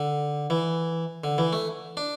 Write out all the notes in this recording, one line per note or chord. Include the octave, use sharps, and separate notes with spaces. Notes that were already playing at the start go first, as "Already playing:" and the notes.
Already playing: D3
E3
D3
E3
A3
D4